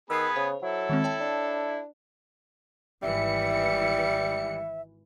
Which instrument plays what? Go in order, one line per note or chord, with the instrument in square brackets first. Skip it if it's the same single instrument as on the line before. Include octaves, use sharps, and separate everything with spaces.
[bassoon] D#3 [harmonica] B3 G#4 B4 [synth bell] E6 C7
[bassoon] C#3 [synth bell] C5
[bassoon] F#3 [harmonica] E4 A4
[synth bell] D#3 G#3 C4
C#5 G5 A5
[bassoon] D4
[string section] G#1 E3 C#7 [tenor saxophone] G3 [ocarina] E5